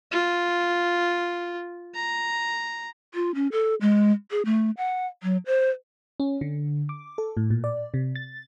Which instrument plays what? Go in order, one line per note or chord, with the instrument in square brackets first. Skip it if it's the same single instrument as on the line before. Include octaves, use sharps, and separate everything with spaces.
[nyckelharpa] F4
A#5
[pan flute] F4
C#4
A4
G#3
G#4
A3
F#5
F#3
C5
[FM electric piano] C#4
D3
D6
A4
A2
A#2
D5
C3
A6